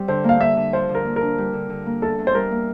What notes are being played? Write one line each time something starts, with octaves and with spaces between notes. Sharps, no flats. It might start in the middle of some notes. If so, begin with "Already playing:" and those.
Already playing: G3 C4
D3 C5
A#3 F5
A#3 E5
D3
F3 C5
D3
A#4
A#3
D4 A#4
G3
D3
D3
A#3
E2 A4
E2
C5
G3 A#4
A#3